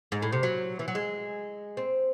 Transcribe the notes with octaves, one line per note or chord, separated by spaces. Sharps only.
G#2
A2
C3
F#3
E3
F#3
G#3
C4